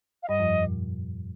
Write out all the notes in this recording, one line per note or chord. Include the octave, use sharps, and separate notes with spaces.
F5
G2 G3 D#5
F2 F3
A#2